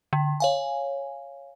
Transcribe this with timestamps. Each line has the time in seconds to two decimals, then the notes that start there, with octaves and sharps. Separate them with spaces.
0.13 D3
0.40 C#5 F5 G#5